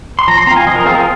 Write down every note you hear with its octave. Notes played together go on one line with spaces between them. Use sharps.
C6
F3 A#5
C6
C4 F4 A#5
G#5
F3 D#5
A#4
C4 F4 G#4
A#4